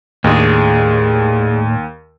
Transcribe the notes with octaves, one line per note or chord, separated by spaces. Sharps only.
D#2 A2 G#3 D4